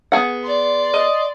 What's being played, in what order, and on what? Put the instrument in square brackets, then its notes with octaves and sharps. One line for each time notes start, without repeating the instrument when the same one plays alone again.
[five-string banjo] B3 G#4 F#5
[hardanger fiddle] D5 C6
[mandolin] D#5